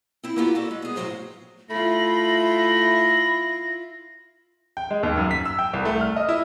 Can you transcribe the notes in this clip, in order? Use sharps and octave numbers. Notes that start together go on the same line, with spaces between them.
C4 E4
A#3 B3 C#4 F4 G4
F#4 A4 D5
G#3
B3 G#4
A2 F3 F#3 C5 G5
A3 E4 F4 B5 A#6
G5
G#3
D#2
F#2
B6
E6
G5
C2
A3
F6
D#5
E4